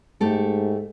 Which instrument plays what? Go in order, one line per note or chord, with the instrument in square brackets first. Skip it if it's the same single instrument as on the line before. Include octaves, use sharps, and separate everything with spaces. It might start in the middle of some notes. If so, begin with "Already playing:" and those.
[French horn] G#2 [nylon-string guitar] A3 G4 A4